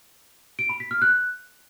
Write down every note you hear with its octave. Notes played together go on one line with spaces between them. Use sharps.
D7
B5
B6
F6
F#6